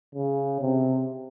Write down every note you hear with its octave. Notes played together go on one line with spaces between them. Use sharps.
C#3
C3